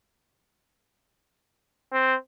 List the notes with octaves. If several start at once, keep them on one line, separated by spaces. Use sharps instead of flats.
C4